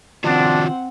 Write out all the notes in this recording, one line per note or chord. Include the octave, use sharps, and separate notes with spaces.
D#3 C4 D4 F4 F#4 F#5